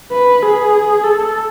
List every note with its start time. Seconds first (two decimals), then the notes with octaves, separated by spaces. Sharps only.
0.12 B4
0.43 G#4
1.04 A4